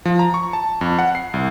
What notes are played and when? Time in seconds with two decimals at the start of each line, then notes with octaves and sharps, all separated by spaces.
0.05 F3
0.19 A#5
0.34 C#6
0.53 A5
0.81 F2
0.99 F#5
1.15 C7
1.34 C2